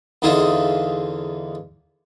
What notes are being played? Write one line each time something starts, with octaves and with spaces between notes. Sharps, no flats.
E2 D3 D#4 F4 G#4 E5